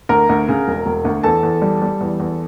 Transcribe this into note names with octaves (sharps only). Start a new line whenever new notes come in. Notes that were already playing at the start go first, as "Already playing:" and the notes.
D2 A#4 A#5
D2
C#3
E1
E1
D2
E2 A4 A5
E2
G3
G3
E2
E2